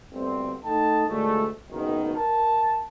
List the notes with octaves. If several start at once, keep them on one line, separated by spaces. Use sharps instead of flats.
G1 D2 D3 C4
A3 D#4 A4 D#5 G5 A5
D2 A#2 G#3 A3
F#1 G#2 B2 D#3
A#4 A5